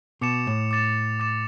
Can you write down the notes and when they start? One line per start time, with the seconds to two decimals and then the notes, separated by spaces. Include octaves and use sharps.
0.21 B2 D6 A6 C#7 E7
0.47 A2
0.71 D6 A6 E7
1.20 D6 A6 E7